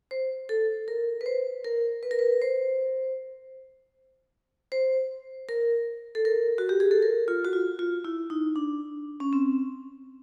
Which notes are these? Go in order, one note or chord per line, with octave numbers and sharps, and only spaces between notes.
C5
A4
A#4
B4
C5
A#4
B4
A#4
B4
C5
C5
A#4
A4
A#4
F#4
G4
G#4
A4
A#4
F4
F#4
F4
F4
E4
D#4
D4
C#4
C4